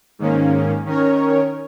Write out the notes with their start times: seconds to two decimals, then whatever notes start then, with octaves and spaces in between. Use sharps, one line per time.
0.19 G#2 D#3 A#3 C#4
0.86 D#3 C#4 A#4 C#5